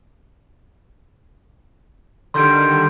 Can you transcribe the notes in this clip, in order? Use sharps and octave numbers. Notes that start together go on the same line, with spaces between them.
D3 D#3 G3 C6 G6 D7